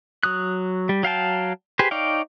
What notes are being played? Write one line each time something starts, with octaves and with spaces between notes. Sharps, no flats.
F#3 D#6 F#6
G3
F#3 F5 G5 A5
G4 G#4 B4 C5
D#4 C#5 D5 F5 G5